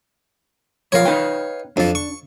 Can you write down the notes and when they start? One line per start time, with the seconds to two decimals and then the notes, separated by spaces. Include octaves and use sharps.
0.92 B1 F3 A#4 C#5 F5
1.05 D#4 B4 G5
1.77 F2 F3 D4
1.95 C#6